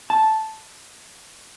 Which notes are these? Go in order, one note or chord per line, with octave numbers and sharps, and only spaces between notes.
A5